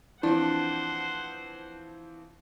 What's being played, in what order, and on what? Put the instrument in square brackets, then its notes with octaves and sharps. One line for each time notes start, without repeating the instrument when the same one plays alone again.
[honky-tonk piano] E3 F3 C4 [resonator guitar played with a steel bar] D4 [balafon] E4 [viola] C5 F#5